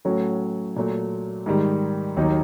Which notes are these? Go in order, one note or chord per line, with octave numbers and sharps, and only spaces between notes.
A2 F#3 A3 C#4 F#4
A#2 F#3 A3
G#2 D#3 G3
D#2 D#3 F#3 A#3 D#4